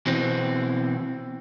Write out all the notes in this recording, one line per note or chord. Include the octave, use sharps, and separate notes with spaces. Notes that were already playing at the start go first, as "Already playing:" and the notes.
B2 E3 C4